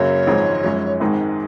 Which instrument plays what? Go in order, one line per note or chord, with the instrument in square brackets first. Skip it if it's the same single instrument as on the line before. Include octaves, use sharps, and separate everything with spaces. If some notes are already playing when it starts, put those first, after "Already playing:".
Already playing: [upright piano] F#2 C#3 F#3 A#3 [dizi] C#5
[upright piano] G#1 G#2 F3 G#3 D#4
F#2 F3 G#3 C#4
G#1 G#2 D#3 G#3 D#4